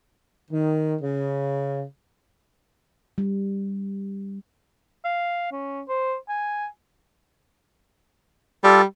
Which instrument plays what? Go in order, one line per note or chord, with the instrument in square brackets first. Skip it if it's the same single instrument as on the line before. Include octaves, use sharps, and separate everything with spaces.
[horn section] D#3
C#3
[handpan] G3
[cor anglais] F5
C#4
C5
G#5
[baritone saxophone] G3 [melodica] F4 A4 D5